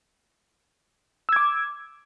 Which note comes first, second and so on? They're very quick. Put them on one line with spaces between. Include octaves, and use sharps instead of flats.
E6 G#6 D6